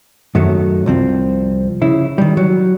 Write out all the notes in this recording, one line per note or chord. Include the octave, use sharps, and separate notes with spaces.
F#2 D#3 F#3 A3
C2 F3 C4
C#3 E4
D#3 G3
F#3